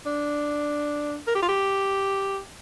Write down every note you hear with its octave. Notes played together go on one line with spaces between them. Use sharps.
D4
A#4
G4
F4
G4